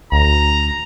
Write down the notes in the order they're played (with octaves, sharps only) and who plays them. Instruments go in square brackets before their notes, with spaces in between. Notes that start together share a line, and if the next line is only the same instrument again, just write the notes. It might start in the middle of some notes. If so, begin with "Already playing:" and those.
[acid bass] D2 [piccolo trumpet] A#5